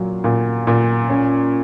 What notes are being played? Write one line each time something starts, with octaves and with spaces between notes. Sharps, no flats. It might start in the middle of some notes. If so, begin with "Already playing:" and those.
Already playing: A#2 F#3
A#2
A#2
C#4